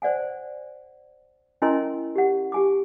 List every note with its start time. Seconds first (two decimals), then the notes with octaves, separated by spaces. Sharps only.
0.02 C5 D5 F#5 G#5
1.62 C#4 E4 A#4 D#5 G#5 C6
2.16 G4 F#5
2.52 G4 G#5 D6